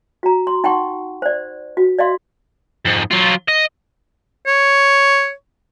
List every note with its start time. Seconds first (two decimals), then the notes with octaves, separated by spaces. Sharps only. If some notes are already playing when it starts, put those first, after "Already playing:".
0.23 F#4 A#5
0.47 C6
0.64 D#4 F#5 G5 C6 C#6
1.22 C5 D5
1.77 F#4
1.99 D5 D#5 F5 C6
2.85 F2 G#2
3.11 F#3 F4
3.48 D#5
4.46 C#5